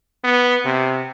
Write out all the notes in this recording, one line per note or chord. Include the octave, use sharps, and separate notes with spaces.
B3
C3